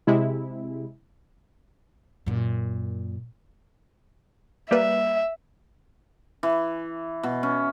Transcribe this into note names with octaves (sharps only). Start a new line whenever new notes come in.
C3 G#3 E4
F#2 A#2
G3 A#3 B4 E5
E3
B2
C#4